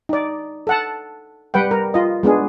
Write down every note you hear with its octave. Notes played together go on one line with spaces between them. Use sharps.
D#4 D5
A4 F#5 A5
G3 B4 F#5 G5
A#4
F4 D#5
G#3 B3 D4 G#4